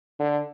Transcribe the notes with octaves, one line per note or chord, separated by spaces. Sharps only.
D3